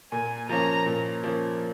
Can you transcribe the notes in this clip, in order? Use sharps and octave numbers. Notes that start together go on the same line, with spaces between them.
A#2 G#5
F3 A#3 C#4 A#5
A#2
F3 A#3 C#4